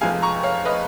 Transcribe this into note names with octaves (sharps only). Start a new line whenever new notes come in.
F1 F2 F3 G#3 F5 G#5
A#5 C#6
C#5 F5
B4 D#5